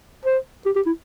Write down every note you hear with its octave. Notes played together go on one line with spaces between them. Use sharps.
C5
G4
G4
E4